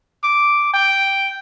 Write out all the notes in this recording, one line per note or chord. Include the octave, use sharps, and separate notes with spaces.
D6
G5